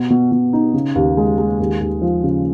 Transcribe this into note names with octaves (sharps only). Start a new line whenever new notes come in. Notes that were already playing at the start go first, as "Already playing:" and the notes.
Already playing: B2
B2
B2
D#4
C#3
D#2
G#3
G#3
D#2
D#2
F3
C#3